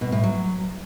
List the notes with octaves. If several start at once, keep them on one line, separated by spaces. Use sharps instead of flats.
B2
A2
F#3